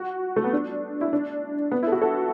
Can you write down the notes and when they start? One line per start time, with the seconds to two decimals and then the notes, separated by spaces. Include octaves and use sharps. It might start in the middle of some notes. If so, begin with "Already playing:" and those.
Already playing: F#4
0.36 A3
0.44 B3
0.53 D4
1.01 E4
1.13 D4
1.72 B3
1.83 E4
1.87 A4
1.92 F#4
2.02 A4